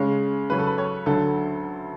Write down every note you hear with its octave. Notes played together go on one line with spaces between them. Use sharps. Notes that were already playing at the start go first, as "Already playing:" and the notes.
Already playing: C#3 G#3 C#4
C#3 F#3 C#4 B4
A4
B4
C#5
D2 D3 F#3 A4